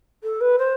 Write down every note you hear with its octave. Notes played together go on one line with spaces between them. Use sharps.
A4
B4
C5